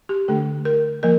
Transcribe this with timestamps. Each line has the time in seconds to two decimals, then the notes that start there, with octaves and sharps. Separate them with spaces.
0.09 G4
0.28 D3 A3 D4 A4
0.65 A#4
1.03 F3 A#3 A#4